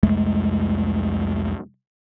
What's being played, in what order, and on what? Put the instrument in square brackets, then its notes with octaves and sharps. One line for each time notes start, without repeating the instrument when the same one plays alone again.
[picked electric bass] C2 F2 G#3 A3